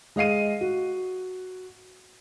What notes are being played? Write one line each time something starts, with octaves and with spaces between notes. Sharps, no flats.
G#3 D#5 F5 C7 D#7
F#4